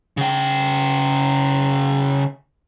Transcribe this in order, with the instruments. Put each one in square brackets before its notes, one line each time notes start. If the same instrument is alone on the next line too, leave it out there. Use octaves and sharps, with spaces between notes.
[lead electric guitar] C#3 G5